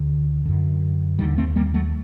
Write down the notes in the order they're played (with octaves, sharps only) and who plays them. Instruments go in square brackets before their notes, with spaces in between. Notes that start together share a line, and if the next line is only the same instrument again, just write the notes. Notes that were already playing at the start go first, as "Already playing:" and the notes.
Already playing: [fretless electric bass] D2 D3
F#2 D3
D#2 D3 D#3 G3
A3 C4
G3 A#3
F#3 A3